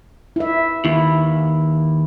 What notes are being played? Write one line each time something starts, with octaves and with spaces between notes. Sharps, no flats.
E4 E5
D#2 E4